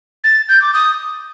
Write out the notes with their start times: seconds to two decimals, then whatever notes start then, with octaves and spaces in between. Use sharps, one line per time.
0.24 A6
0.49 G6
0.62 D6
0.73 D#6